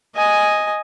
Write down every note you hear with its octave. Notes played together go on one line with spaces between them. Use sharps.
D#5 G#5